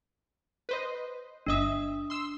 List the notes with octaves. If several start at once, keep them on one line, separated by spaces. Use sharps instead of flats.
B4 C5 D#5
G1 D4 D#5 E5 D#6
C6 E6